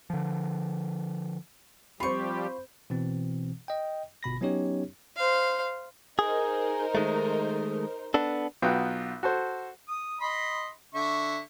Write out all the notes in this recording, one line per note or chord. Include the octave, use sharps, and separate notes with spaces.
D3 F3
F3 G3 C4 F4 G4 C5 B5 C#6
B2 E3 C4
D#5 G5
G1 B2 B5 A#6
F#3 B3 C#4 D#4 G4 C#5
C5 F5
D#4 G#4 A#4 C5
D#3 G#3 A3
B3 D4 A4
B1 B3 F4 F#4 G5
F#4 A4 C5
D#6
D#5 B5 C6
D3 E5 C#6